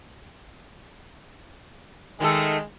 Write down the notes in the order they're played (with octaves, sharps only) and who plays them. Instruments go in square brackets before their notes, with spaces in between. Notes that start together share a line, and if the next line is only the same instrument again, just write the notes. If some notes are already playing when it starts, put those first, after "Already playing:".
[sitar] D#3 A3 A4 [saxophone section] G#3